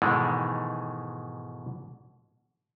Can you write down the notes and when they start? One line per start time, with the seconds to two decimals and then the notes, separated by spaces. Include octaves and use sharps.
0.02 G#2 B2 D#3 E3 G#3 A3